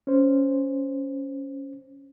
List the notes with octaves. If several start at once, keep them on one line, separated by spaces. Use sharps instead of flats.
C#4 C5